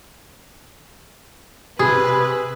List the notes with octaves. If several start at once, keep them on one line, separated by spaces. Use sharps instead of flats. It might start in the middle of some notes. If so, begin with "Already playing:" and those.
C3 G#4 B4 B5